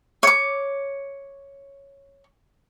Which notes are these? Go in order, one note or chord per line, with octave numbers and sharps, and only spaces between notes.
C#5 D6